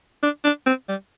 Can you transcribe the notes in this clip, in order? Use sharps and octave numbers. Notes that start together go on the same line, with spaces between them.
D4
D4
C4
G3